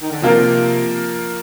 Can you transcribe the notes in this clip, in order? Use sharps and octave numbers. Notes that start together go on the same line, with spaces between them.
D#3
D3
C3 F3 A#3 F4 A#4